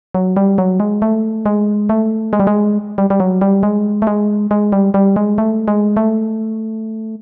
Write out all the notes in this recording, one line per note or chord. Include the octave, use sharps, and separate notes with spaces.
F#3
G3
F#3
G#3
A3
G#3
A3
G#3
G3
G#3
G3
G3
F#3
G3
G#3
A3
G#3
G#3
G3
G3
G#3
A3
G#3
A3